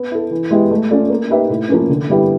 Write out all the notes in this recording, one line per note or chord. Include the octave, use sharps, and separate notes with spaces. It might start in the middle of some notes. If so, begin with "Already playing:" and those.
Already playing: B3
E4 A4
E3
G#3 B3 E4 G4
A3
C#4 F4 A4 D5
A#3
D#4 G4 B4 E5
A2
F3 A#3 C#4
D3
G3 B3 E4 G4